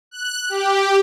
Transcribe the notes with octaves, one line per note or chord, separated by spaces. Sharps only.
F#6
G4